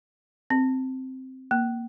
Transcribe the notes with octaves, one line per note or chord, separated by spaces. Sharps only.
C4
A#3